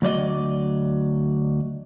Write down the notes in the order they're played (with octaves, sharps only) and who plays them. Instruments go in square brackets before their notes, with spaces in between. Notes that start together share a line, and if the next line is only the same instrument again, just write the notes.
[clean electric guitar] D2 F#3 D5 D#5